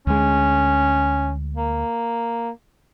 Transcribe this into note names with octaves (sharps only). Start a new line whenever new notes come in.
D2 G#3 C#4
A#3